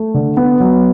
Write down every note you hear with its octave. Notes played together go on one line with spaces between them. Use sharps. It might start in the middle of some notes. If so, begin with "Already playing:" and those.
Already playing: A3
D3
B3
F#3